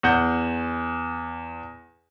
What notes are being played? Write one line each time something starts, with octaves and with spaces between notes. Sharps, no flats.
E2 F#5 G6